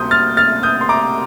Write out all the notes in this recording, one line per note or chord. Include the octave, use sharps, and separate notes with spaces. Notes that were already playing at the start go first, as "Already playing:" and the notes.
Already playing: D2 C3 G3 A#3 C6 D#6 G6
F6 A6
F6 A6
D#6 G6
C6
A#5 D6